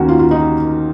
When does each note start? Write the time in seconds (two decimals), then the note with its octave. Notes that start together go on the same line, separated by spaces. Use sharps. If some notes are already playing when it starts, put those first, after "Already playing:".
Already playing: D#2 D#3 A#3 C#4 F#4
0.09 F4
0.19 F4
0.31 D#4